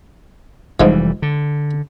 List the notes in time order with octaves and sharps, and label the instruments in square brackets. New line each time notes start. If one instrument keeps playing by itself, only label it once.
[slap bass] F1 E3 G3 [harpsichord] G#2 F3
[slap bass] D3